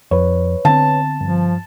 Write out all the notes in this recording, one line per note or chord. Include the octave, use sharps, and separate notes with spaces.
F2 B4 C#5
D3 B3 C4 A5
G2 F3